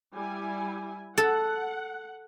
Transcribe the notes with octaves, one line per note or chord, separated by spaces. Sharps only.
G3 E4 G#5
A4 F#5